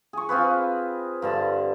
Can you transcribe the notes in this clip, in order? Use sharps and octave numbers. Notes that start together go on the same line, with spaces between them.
G#4 C#6
C4 F4 G#4 B4
G2 D3 A5